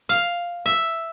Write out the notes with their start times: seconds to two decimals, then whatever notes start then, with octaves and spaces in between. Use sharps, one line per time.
0.09 F5
0.66 E5